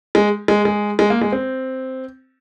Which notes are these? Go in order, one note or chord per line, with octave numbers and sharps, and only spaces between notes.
G#3
G#3
G#3
G#3
A#3
G#3
C4